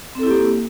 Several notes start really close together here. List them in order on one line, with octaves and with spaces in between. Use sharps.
C4 A4 E4 G4 A#3